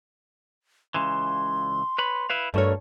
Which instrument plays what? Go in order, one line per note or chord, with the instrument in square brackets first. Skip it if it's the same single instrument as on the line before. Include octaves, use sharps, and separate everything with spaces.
[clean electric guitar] C#2 C#3 E3 [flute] C6
[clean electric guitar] B4 C#5 B5
E4 B4 F5
[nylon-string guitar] G2 C#5 [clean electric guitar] A3 F#4 A#4 [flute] A4